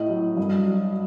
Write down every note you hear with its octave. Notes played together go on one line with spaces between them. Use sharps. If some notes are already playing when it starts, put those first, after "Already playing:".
Already playing: A2 D#5
F#3
G2
F#3